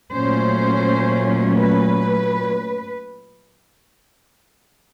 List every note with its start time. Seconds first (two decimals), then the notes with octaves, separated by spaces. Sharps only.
0.14 A#2 F#3 A3 C#4 C5
1.58 B4